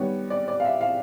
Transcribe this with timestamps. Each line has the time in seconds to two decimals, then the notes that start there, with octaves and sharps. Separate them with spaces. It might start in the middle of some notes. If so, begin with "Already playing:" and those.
Already playing: D#3 G3 B3 C#5
0.30 D5
0.48 D5
0.60 F5
0.65 E5
0.81 F5